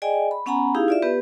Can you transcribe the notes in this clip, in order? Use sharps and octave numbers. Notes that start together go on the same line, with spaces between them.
G#4 D5 D#5 G5 G#5
B5
B3 C#4 F#5 G#5 A#5 B5
D#4 E4 G4 G#4 F5
F4 D5 E5
B3 G4 B4